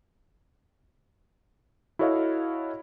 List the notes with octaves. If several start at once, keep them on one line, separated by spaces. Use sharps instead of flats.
E4 F#4 A4 C#5 D#5 F5